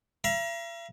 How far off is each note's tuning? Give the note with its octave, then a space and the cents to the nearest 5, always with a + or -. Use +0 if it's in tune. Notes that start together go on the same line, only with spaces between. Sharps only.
E5 +45 A#5 +35